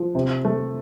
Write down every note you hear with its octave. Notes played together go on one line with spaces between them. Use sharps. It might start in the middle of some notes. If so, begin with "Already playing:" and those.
Already playing: F3
C3
A3